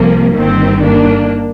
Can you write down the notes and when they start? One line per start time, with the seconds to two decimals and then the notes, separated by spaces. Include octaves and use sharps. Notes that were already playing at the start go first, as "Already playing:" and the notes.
Already playing: C2 C3 F3 A#3
0.35 G1 G2 D#3 C4
0.80 A#3 D4